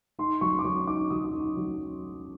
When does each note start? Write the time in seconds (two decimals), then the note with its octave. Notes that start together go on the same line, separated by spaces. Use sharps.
0.19 D#4 C6
0.41 F#3 C#6
0.59 D6
0.65 F#3 C#6
0.87 D#4 D6
1.10 F#3 D#6
1.34 D#4
1.57 F#3